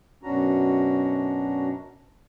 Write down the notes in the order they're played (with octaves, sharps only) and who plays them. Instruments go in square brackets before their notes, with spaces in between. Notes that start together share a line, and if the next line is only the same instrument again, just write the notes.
[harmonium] F#2 B2 C#4 D4 F#4 A#5